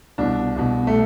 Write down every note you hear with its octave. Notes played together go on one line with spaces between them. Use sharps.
C2 B2 D4
C2 B2
A3